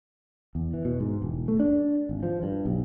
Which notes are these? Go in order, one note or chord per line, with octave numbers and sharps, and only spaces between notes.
E2
E3
B2
G#2
E1
A3
D4
G#1
F3
G2
B1